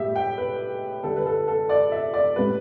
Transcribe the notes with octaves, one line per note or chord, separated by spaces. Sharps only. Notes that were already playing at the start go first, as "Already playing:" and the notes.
Already playing: A2 G3 G4 E5
G5
B4
D3 G3 A4
B4
A4
A4
D5
E5
D5
A2 G3 B4